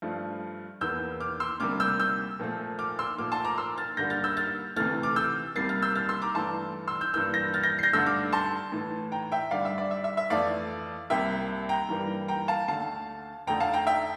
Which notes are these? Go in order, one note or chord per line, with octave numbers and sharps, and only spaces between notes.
G2 F3 A3
E2 E3 A#3 E6 G6
D6 F6
C6 E6
D2 C3 G3 A#3 D6 F6
E6 G6
E6 G6
A#2 F3 A3
D6 F6
C6 E6
A#2 F3 A3 D6 F6
A5 C6
A#5 D6
C6 E6
F6 A6
G2 D3 G3 A#3 G6 A#6
F6 A6
E6 G6
F6 A6
D2 C3 E3 A3 F6 A6
D6 F6
E6 G6
C2 C3 G3 A#3 A6 C7
F6 A6
E6 G6
F6 A6
C6 E6
A#5 D6
G2 E3 A3 A5 C6
C6 E6
E6 G6
G2 E3 A#3 E6 G6
G6 A#6
F6 A6
G6 A#6
C7
G6 A#6
G2 D3 A3 E6 G6
D6 F6
A5 C6
A2 E3 A3
G5 A#5
E5 G5
G2 D3 G3 D5 F5
E5
D5
E5
E5
E5
F2 E3 A3 D5 F5
C2 C3 G3 A#3 E5 G5
G5 A#5
G2 E3 G3 A#3
G5 A#5
F5 A5
D2 D3 A3 F5 A5
F2 D3 A3 G5 A#5
F5 A5
G5 A#5
E5 G5